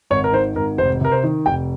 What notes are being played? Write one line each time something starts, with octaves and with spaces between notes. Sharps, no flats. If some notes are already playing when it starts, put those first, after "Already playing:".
G#1 C#5
A#4
D#3 C5
G#1 A#4
F1 C5
C3 A#4
C5
D#3
F1 G5